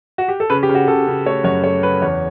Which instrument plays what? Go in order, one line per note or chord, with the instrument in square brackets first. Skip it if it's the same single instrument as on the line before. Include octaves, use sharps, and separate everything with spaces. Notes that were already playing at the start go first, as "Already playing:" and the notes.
[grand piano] F#4
G4
A4
C#3 B4
G4
C#3
F#4
C#3 A4
C#3
A3 C#5
F#2 C#5
A3 C#5
C#3 B4
E2 C#5